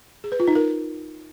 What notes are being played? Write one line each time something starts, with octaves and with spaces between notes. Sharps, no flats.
G#4
B4
F4
D#4
A#4